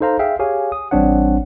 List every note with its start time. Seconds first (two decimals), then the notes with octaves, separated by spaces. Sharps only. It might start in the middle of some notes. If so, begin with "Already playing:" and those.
0.01 D#4 A4 C5 F5 A#5
0.19 G#4 E5 F5 G5
0.39 G4 G#4 C#5 F5 G#5
0.72 D#6
0.91 A1 G3 C4 D4 C#5 F#5